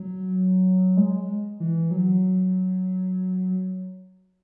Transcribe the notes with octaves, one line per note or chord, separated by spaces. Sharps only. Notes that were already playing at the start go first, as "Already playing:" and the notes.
Already playing: F#3
G#3
E3
F#3